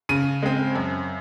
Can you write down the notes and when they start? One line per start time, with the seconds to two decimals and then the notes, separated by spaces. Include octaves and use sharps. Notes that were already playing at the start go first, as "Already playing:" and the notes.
0.09 C#3 D#7
0.43 G#3 C4
0.75 F#2